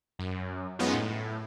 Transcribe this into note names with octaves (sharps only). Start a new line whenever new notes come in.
F#2
F#2 G#3 B3 C#4 D#4 F4
A2